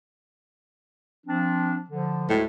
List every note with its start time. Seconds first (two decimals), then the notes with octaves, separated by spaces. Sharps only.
1.26 F3 C4 D4
1.90 D3 F3
2.30 D2 A2 G#3 A3